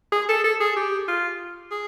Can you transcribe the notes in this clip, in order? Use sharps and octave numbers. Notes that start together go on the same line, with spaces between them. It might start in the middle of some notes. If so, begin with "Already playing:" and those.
G#4
A4
A4
G#4
G4
F4
G#4